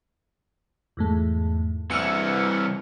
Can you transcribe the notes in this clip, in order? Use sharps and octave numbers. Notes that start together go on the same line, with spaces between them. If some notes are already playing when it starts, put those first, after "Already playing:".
E2 G#2 A3
C2 E3 E6 F6 C#7